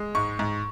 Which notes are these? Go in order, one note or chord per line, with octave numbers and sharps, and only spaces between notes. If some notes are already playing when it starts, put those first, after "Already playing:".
Already playing: G#3
G#2 C#6
G#2